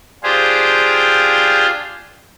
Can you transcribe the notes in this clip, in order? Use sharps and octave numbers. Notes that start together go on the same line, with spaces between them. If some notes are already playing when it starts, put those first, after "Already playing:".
D4 F4 G4 G#4 C5